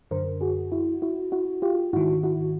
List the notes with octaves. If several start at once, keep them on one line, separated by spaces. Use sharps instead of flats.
F#2 D3 A#4 C5
F#4 G#4
E4 F#4
E4 F#4
E4 F#4
F4 G4
G#2 D#3 E4 F#4
E4 F#4